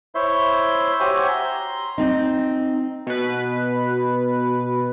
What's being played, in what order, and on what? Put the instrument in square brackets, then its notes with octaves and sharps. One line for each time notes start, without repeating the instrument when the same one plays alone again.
[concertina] E4 C5 C#5 E5 C6
F#4 G4 C5 C#5 E5 G#5
A#5 C6
[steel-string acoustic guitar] C4 D#4
[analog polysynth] B2 B4